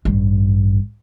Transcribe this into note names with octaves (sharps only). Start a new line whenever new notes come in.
A1 G2